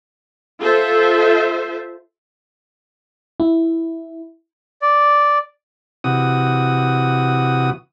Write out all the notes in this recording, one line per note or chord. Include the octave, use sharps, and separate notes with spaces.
F4 A4 C5 E5
E4
D5
C3 E3 F#4 D#6